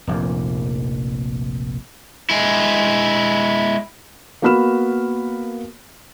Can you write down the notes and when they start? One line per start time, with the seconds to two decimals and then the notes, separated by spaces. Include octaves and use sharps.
0.07 F1 A#1 F2 A#3
2.30 G#3 E4
4.42 A#3 B3 F#4 B5 F6 E7